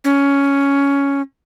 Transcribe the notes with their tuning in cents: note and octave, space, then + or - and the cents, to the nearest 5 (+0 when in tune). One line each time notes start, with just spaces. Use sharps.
C#4 +10